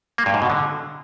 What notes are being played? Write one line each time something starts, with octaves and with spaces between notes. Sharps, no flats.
A#3
G2
G#2
B2
D3